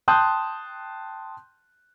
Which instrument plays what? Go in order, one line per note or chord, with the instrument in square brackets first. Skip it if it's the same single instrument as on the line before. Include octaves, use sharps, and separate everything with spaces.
[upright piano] G5 A5 C6 D#6 F#6 G6